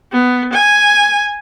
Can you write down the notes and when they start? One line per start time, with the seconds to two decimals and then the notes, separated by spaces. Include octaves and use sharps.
0.12 B3
0.53 G#5